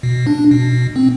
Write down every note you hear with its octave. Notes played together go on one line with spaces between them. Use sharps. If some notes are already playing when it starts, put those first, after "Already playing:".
B2
D4
B2
C4